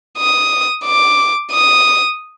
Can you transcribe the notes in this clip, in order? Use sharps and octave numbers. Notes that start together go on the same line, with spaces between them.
D#6
D6
D#6